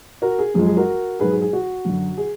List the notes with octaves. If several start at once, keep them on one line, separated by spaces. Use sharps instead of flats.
F#4 A#4
G#4
F#2 F3 G#3 G#4
G#4
F#4 A#4
G#2 F#3 G#4 B4
G#4
G#4
F#4
F#2 D3 F#3
G#4